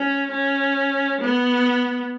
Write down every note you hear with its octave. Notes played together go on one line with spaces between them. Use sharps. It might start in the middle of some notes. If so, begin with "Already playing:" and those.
Already playing: C#4
C#4
B3